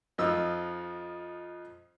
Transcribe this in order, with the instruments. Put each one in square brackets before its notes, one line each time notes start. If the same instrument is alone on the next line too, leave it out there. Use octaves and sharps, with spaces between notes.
[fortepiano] F2 F3 D#4 E6